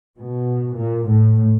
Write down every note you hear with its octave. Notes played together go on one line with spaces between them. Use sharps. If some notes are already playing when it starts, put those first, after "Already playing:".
B2
A#2
A2